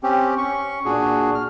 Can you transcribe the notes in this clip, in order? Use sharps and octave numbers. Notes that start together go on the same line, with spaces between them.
C4 C#4 G4
C#4 C#6
A#2 D4 F#4 G#4
F6